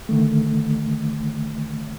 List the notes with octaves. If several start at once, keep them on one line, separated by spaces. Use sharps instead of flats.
D3 D#3 A3